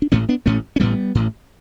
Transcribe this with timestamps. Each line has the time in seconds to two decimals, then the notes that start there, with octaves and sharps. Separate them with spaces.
0.02 D4
0.12 A1 A2 A3 C#4
0.29 B3 D4
0.46 A1 A2 A3 C#4
0.76 C#4
0.80 A1 A2 G3 B3
1.15 A1 A2